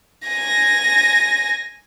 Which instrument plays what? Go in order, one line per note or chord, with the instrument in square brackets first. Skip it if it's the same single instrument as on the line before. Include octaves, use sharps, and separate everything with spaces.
[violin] G#5 A#6